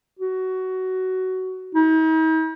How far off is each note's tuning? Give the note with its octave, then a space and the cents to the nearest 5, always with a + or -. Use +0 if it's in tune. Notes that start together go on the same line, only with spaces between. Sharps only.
F#4 +15
D#4 +45